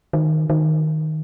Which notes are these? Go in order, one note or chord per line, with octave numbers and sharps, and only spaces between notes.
D#3
D#3